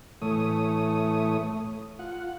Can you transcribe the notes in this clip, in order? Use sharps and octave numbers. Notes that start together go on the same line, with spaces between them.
A2 E3 A3 C#5 D#6
F4 F#5